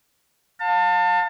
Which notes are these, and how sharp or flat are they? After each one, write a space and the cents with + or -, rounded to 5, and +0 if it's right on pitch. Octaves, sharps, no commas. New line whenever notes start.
F5 +30 A5 +30